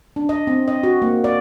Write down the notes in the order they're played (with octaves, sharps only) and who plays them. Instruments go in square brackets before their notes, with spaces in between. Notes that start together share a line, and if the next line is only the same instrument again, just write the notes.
[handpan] D4
D#5
C4
D#5
F#4
A#3
D5